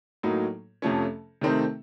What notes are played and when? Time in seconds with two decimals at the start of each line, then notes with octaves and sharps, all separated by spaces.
0.23 A2 F#3 A#3 D#4
0.82 F2 C3 F3 A3 C#4
1.41 C3 D#3 A3 C4 D#4